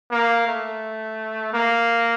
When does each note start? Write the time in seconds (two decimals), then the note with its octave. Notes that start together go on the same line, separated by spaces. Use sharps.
0.11 A#3
0.47 A3
1.54 A#3